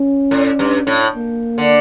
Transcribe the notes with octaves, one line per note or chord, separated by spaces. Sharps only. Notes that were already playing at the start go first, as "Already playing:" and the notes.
Already playing: C#4
A2
G2
A2
A#3
D3